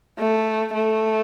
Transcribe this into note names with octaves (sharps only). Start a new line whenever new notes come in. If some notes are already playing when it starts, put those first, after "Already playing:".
A3
A3